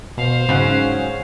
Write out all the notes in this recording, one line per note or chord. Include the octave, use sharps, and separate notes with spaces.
B2 C5 F5
G#2 C#3 F#3 C#4